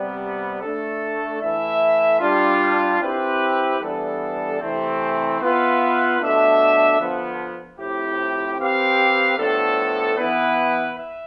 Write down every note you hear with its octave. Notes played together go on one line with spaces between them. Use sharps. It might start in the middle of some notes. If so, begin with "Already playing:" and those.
Already playing: C3 G3 B3
A3 D4 A4
E3 A3 E4 A4 E5
G3 D4 F4
C4 E4 G4 B4
E3 G3 B3 D4 A4
C3 E3 A3 C4
B3 F4 B4 E5
B2 A3 D4 A4 E5
D3 F3 B3
A2 F3 C4 E4 G4
C4 G4 B4 F5
A2 F3 B3 D4 A4
E3 B3 E4 B4
E5